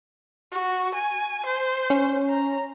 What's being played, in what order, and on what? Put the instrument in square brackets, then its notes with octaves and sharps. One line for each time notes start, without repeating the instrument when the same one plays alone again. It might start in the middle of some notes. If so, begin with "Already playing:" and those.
[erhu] F#4
G#5
C5
[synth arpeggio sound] C#4
[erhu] A#5